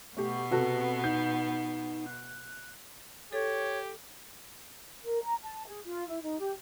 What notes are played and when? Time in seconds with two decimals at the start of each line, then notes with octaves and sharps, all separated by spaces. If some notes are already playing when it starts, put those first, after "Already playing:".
0.17 B2 A3 B3 G4 C#6
0.51 C3 F#4 A4 B4
1.04 D#4 G6
2.06 F#6
3.33 G4 A4 C#5
5.03 A#4
5.22 A#5
5.43 A5
5.67 G#4
5.84 F4
6.08 E4
6.22 D#4
6.39 G4